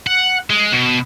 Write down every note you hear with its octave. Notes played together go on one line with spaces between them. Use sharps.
F#5
G#3
B2